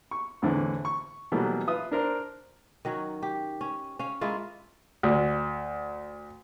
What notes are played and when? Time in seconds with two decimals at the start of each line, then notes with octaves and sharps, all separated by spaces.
0.11 C#6
0.42 E2 A2 D3 E3 C4
0.85 C#6
1.32 B2 E3 F#3 G3 A3 A#3
1.68 F4 B4 E5 D#6
1.91 D4 A#4 C5
2.85 D#3 F#3 C#4
3.23 G4
3.61 C#4
3.99 C#4 F5
4.21 G#3 A#3 E4 F4
5.03 D2